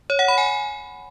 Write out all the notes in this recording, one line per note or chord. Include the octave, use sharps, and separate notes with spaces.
C#5
F#5
B5
G#5